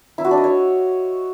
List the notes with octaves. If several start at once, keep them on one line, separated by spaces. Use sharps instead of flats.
E4
F#4
D4
D#5
C#5